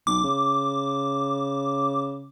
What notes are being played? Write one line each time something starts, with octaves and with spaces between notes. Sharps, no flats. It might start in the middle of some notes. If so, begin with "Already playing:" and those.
B1 D6
C#3